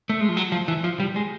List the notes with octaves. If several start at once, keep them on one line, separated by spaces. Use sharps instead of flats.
A3
G#3
F3
F#3
F3
E3
F3
G3
G#3